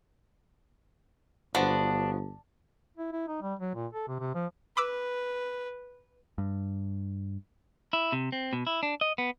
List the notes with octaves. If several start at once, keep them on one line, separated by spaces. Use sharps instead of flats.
G1 F3 B3 D4 F#4
E4
E4
D#4
G3
F#3
A#2
A4
C3
C3
F3
B4 B5 D6 E6
G2
E4
C3
C4
B2
E4
D4
D#5
B3